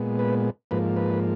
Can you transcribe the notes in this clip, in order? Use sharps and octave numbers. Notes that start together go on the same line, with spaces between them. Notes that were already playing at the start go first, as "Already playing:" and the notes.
Already playing: A#2 G#3 B3
B4
G#2 F3 A#3 B4
B4